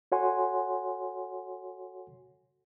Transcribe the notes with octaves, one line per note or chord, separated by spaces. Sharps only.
F#4 A4 C#5 F#5 G#5 C6